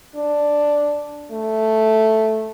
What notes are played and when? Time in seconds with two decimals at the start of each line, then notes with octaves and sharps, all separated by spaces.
0.16 D4
1.32 A3